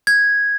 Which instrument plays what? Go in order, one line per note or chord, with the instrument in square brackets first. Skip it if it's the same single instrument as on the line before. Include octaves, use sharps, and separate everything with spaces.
[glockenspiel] G#6